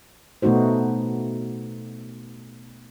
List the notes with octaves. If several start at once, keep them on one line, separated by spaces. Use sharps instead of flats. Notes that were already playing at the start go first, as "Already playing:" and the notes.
B2 A3 B3 D#4 F#4 C5